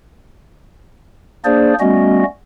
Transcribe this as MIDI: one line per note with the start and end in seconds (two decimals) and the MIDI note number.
1.45 1.74 58
1.45 1.74 62
1.45 1.74 68
1.45 1.74 72
1.45 1.74 74
1.80 2.23 55
1.80 2.23 57
1.80 2.23 59
1.80 2.23 61
1.80 2.23 66
1.80 2.23 75